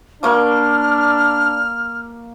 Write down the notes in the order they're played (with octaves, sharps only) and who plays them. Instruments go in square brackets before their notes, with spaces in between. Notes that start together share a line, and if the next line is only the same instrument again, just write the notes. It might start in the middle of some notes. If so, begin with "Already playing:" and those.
[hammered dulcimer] A#3 C#6 D6 [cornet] D4 [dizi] F6